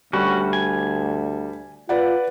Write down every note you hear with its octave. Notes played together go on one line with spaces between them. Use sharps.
D2 G3 C#4 F#4
G#5
F4 B4 D5 F#5